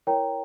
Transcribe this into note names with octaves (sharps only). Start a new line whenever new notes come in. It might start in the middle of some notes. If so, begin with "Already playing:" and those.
E4 A#4 C#5 G5 A#5